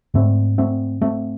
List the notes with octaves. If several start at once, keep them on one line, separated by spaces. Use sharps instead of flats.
G#2 A3 C4
A3 C4
A3 C4